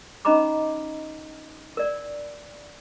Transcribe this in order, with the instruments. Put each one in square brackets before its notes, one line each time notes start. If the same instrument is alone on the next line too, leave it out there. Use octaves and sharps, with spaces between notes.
[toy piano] C#4 D#4 D#5 A#5 B5 D6
A#4 D5